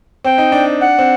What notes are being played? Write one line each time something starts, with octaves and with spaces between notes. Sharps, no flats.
C4 G5
D#4
D4
F#5
C4